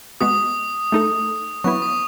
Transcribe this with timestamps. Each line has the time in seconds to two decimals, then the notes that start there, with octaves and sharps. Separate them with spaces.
0.21 G#3 B3 F#4 D#6
0.92 A3 D#4 A4
1.64 F#3 B3 E4 C#6
1.82 D#6